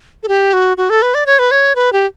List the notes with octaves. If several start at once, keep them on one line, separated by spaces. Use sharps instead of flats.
A4
G4
F#4
F#4
A4
B4
D5
C#5
B4
C#5
B4
G4